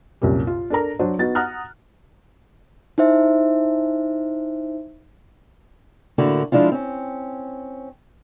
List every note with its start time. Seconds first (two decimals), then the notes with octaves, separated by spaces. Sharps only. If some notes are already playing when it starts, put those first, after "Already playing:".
0.22 C2 F#2 A#2 G3
0.47 F4
0.70 D4 A4 A#4 A#5
0.99 F#3 D4 C5
1.19 B3 D#4 F#4 A6
1.35 F#5 A#5 D#6 F6 F#6
2.98 D#4 E4 C5 E5
6.18 A2 D3 A#3 E4 F#4
6.52 F3 G#3 D4 E4 F4
6.72 C4 C#4